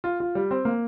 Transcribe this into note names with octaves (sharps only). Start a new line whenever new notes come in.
F4
F4
G3
C4
A#3